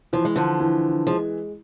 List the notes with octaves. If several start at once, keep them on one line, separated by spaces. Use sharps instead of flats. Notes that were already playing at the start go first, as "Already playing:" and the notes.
E3 F3
G#3
D3 F3
E3
F3 G#3